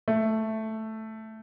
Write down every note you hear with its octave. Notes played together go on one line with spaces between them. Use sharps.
A3